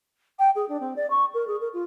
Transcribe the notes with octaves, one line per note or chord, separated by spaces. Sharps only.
G5
G#4
D4
C4
D5
C#6
A#4
G#4
A#4
F4